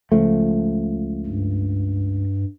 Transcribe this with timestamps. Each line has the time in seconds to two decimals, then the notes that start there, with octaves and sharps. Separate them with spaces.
0.12 C#2 F3 A3
1.26 G2